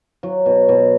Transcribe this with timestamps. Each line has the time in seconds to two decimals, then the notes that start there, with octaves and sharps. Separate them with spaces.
0.23 F#3
0.46 B2
0.69 B2